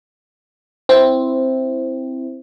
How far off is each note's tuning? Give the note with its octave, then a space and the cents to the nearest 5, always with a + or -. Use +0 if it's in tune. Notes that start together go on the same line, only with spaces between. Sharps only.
C4 +0 E4 +0